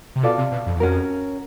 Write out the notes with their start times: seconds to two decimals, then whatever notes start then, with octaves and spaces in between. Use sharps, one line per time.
0.16 C3
0.23 B2 F4 A4 D5
0.38 C3
0.52 B2
0.66 F2
0.76 E2
0.80 F2 C#4 F#4 A#4